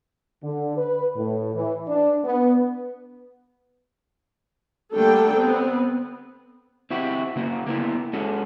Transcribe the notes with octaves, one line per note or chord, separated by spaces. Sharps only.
D3
B4
A2
E3
D4
B3
D3 G3 A3 A#3 A4 G5
B3 C4
C4 E4 F#4 G4
C#3 A#3 F#4
A#3 B3 E4
G#3 C#4 F#4 A4